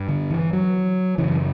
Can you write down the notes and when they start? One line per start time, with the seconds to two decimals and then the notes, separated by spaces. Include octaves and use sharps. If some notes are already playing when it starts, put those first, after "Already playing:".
Already playing: G2
0.08 D3
0.30 E3
0.53 F#3
1.18 F#2 C#3 E3